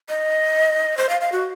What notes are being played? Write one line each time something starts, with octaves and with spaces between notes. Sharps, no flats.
D#5
C5
F5
F5
F#4